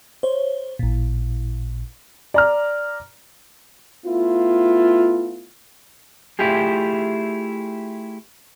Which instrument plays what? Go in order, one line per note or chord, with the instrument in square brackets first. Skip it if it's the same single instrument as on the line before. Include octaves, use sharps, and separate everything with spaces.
[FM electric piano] C5 C#5
A1 A#2
[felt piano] D5 A#5 F6
[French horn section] A3 B3 E4 F4
[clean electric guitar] A3 E4 F4 G4 G#4